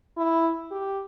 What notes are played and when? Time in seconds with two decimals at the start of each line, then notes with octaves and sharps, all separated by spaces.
0.17 E4
0.71 G4